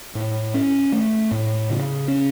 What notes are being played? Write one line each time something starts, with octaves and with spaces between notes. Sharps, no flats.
A2
C#4
A3
A2
C#3
C#4